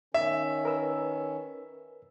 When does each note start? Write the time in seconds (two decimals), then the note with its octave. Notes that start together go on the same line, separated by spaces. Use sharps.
0.14 D#3 C#4 E5
0.65 A#4 B4 E6